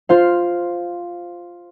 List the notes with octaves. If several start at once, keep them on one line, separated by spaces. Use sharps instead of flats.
F4 C5 F5